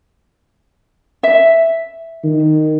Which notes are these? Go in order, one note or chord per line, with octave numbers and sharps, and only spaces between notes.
E5
D#3